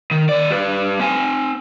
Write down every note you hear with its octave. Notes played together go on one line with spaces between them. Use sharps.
D#3
D#3 D5
G3 B4
C4 G#5